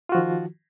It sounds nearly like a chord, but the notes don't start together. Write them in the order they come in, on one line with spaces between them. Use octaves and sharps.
F4 F#4 F3 D#3